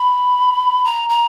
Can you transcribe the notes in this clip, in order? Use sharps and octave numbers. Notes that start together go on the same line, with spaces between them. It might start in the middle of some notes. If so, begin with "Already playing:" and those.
Already playing: B5
A#5
A#5